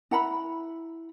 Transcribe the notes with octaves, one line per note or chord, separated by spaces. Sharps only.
E4 F#5 A#5 B5